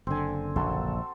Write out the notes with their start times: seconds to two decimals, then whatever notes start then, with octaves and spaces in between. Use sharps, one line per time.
0.07 F#1 D3 C4 G#5
0.56 A#1 F#4 A4 C6